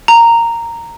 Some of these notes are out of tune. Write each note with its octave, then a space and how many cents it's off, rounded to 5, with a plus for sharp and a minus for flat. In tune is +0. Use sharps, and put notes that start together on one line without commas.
A#5 -10